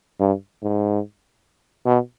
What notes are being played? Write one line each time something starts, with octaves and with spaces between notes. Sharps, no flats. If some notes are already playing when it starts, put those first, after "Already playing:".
G2
G#2
B2